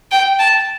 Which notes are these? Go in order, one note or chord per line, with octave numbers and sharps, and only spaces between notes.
G5
A5